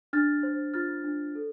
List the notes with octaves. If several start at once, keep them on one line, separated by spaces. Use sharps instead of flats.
D4 F6 A6
C5
F4 F6 A6
D4
A4